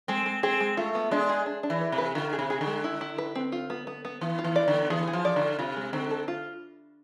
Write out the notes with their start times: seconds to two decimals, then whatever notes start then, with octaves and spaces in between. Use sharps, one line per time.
0.08 G#3 C4
0.26 G#3
0.43 C4 G#4
0.60 G#3
0.77 A3 F4
0.95 B3
1.11 G#3 D4
1.29 G#4
1.46 D4
1.63 D4
1.70 E3
1.81 B4
1.92 C3
1.98 B4
2.15 D3 F4
2.33 G#4
2.39 C3
2.50 G#4
2.61 D3
2.67 G#3
2.84 E4
3.01 E4
3.18 B4
3.36 C4
3.52 F4
3.70 B3
3.87 B3
4.05 B3
4.21 E3 B3
4.39 F4
4.44 E3
4.56 D5
4.68 D3
4.74 B3
4.90 E3 G#4
5.07 G#4
5.13 F3
5.25 D5
5.36 D3
5.41 F4
5.59 C3 F4
5.76 G#3
5.93 D3 C4
6.11 A4
6.28 F4